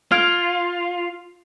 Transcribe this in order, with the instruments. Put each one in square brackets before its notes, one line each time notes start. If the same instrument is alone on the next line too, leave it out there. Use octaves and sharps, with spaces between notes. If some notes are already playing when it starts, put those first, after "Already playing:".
[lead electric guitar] F4 [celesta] F6 G#6 D7